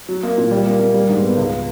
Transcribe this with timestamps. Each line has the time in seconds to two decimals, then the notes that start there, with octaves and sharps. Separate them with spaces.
0.09 F#3
0.23 A#3
0.38 A#2
0.51 G3
0.65 A#3
0.79 A#3
0.94 G3
1.09 G#2
1.23 B3
1.37 C#2